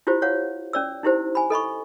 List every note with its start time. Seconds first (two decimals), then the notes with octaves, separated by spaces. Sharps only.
0.07 E4 F4 G4 C5
0.22 C#5 F5 F#5
0.73 C#4 D5 E6
1.03 D#4 E4 G4 C5
1.35 G#5 B5
1.50 A4 D#5 B5 C#6